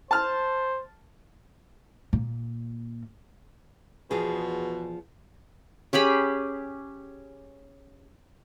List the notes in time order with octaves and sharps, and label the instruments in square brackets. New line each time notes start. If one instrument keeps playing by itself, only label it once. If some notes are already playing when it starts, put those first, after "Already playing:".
[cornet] C5 [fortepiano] A5 F6
[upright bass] A#2
[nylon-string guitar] E2 F3 G#4 [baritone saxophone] B2
[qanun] C#4 G4 G#4 B5